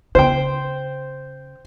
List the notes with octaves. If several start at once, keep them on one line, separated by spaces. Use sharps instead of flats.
C#3 C5 G5